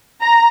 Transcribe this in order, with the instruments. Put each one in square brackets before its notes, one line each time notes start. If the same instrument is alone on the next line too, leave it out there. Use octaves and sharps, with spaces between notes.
[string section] A#5